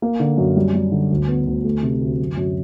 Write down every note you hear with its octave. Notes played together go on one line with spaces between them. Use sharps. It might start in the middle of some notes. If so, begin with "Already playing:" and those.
A#3
D3
F#2
G3
G3
D3
D2
B3
D2
A3
C3
D2
F#2
F#2